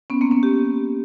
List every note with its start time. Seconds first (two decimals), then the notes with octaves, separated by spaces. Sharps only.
0.10 B3 C#4
0.21 A#3 C4
0.31 B3 C#4
0.43 G4